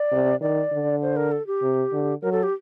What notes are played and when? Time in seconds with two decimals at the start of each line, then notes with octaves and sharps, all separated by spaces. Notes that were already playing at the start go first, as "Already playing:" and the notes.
Already playing: D5
0.12 C3
0.41 D#3 D5
0.72 D3
1.02 C5
1.16 A#4
1.32 A4
1.47 G4
1.62 C3
1.93 D3
2.22 F#3 A#4
2.32 A4
2.43 G4